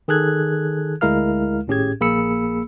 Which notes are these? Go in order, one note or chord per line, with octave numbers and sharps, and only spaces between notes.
D#3 G#4 A4 F#6 G#6
D2 G#3 E4 A#4 F5 F6
G#1 A2 C#4 G4 G#4 G#6
A#1 A#3 G#4 B5 E6 C#7